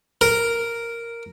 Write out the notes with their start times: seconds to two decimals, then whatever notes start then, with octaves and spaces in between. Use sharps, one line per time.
0.21 A#4